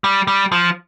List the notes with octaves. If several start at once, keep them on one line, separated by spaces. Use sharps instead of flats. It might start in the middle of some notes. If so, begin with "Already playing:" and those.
G3
G3
F3